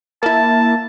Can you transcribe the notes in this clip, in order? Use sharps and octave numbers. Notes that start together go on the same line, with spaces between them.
A#3 E4 A5